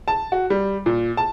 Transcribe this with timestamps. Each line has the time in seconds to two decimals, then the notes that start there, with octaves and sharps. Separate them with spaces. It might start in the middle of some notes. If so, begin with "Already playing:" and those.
0.08 A5
0.32 F#4
0.50 G3
0.86 A#2
1.17 A5